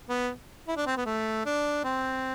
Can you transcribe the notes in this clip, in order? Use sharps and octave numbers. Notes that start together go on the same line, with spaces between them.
B3
E4
D4
C4
B3
A3
D4
C4